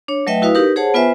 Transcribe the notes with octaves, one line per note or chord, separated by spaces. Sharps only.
D4 C#5
F#3 A3 B4 D#5 E5 G5
E4 F#4 B4 F5 D#6
D#4 G4 A#4 B4
G#4 C5 C#5 F#5 A5
B3 F4 B4 C5 E5 G#5